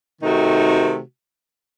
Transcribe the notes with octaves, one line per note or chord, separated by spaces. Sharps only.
C3 D#3 A3 D#4 F#4